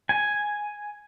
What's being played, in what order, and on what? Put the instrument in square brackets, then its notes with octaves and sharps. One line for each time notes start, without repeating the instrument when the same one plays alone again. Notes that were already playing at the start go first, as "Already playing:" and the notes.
[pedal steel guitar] G#5